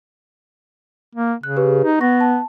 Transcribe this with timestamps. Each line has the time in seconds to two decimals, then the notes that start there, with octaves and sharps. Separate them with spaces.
1.15 A#3
1.43 C#3 F#6
1.56 G4 G#4 B4
1.84 D#4
2.01 B3 C#6 A#6
2.21 A5